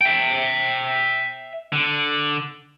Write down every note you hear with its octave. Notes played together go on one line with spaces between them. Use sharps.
E5 G5
D3